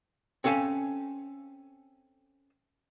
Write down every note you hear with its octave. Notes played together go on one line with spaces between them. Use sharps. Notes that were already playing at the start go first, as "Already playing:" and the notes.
C4 C#4 A4 F5 G#5